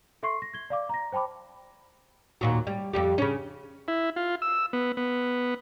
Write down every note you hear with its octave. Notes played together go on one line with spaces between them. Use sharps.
A4 E5 C6 C#6 C7
A#6
G#6 G7
D5 F5 D6
A#5 A#6
C5 G5 A5 B5 D6
D#2 A#2 F#3
G3
F2 G3 G4
C#3 C#4
E4
F4
E6
B3
B3